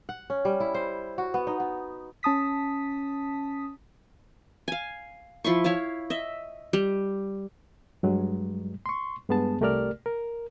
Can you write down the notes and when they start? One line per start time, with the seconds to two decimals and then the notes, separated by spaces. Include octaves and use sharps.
0.09 F#5
0.30 C#4
0.45 G3
0.60 E4
0.74 C5
1.18 F#4
1.34 B3
1.47 D#4
1.60 B3
2.23 C#4 A5 D#6 B6
4.68 F5 G#5
5.44 F3 E4 C6 C#6
5.64 E4 C#5 E5 F5
6.10 D#5 E5
6.73 G3
8.03 G2 F#3 G#3
8.86 C6 C#6
9.29 G2 G#3 B3 G#4 A5
9.61 C2 A3 G4 A#4 D5 F6
10.06 A#4